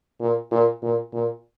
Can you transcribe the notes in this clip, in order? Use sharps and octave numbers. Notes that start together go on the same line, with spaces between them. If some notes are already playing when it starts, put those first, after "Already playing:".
A#2
A#2
A#2
A#2